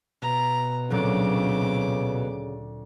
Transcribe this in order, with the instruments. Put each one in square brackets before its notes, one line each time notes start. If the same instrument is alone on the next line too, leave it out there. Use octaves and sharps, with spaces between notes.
[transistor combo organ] B2 [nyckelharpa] A#5
[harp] D2 A#2 F#3 [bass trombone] C#3 [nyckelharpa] C4 D6